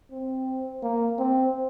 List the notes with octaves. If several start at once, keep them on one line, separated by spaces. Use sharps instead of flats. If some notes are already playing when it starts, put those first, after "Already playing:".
C4
A#3
C4